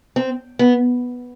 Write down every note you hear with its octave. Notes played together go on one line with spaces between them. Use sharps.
C4
B3